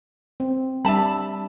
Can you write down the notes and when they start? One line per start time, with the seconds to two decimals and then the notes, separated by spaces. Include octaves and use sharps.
0.40 C4
0.85 G3 D4 E5 A5 B5